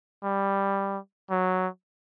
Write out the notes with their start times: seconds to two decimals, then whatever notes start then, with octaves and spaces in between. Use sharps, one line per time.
0.24 G3
1.31 F#3